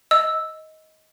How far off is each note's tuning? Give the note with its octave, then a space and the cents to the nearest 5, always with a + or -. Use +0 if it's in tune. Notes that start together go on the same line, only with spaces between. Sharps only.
D#5 +15 E6 +0